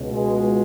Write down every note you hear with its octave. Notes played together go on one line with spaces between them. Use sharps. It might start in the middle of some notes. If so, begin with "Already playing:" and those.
Already playing: C#2 B2
G#3